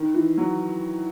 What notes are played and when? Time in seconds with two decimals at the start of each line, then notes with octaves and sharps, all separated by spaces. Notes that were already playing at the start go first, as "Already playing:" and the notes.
Already playing: D#3
0.14 E3
0.37 F#3